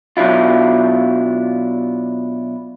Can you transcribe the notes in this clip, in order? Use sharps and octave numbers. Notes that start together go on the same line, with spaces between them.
B2 F#3 D4 E4 F4